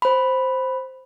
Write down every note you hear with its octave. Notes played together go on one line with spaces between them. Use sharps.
C5 B5